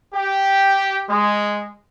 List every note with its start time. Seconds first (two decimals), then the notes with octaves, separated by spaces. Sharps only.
0.13 G4
1.09 G#3